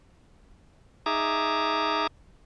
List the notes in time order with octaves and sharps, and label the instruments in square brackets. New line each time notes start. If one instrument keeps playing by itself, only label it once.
[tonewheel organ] D#4 G#4 E5 A#5 D6